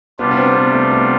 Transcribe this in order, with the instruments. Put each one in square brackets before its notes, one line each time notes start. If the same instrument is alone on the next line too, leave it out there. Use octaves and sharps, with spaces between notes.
[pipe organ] C3 G3 D4 F4 [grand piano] B3
[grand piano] B3
C4
B3
A3
B3